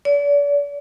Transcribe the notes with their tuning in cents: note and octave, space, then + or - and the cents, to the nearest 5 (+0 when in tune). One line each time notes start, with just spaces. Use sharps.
D5 -40